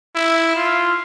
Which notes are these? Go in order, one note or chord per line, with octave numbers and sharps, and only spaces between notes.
E4
F4